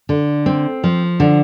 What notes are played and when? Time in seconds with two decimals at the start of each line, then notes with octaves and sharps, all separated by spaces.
0.09 D3
0.46 C4
0.84 F3
1.20 D3